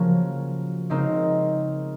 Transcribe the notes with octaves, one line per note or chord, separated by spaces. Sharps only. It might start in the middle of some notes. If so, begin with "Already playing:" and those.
Already playing: C#3 F3 A#3 C#4 F#4
C#3 G#3 C4 D#4 A#4